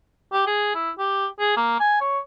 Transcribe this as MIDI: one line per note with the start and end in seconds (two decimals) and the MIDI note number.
0.33 0.42 67
0.47 0.71 68
0.75 0.91 64
0.99 1.26 67
1.40 1.55 68
1.56 1.78 58
1.80 1.98 80
2.01 2.19 73